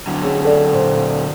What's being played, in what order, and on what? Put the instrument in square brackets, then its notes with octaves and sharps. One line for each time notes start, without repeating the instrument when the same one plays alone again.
[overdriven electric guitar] D3 F#3
[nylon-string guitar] C#4 G#4 C#5
[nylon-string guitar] C#4 [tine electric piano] A4 D5
[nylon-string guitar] A#2 C5